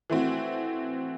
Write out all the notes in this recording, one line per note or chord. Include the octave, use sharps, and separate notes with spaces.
E3 A3 C4 F#4